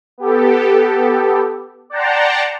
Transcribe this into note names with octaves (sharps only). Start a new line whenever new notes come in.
B3 G4 A4
D5 F#5 G5 A5 A#5 C6